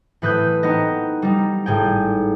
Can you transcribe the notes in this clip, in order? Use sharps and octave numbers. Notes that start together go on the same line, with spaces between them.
A2 E3 B4 D#6 F#6 G6
B3 C4 D#4 D#5
G3 D#4
G#1 A2 G#4 G5